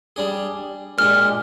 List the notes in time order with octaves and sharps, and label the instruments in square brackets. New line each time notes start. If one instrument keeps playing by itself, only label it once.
[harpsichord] G3 D4 G#4
[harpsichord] A#2 G#3 D4 G4 [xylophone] F6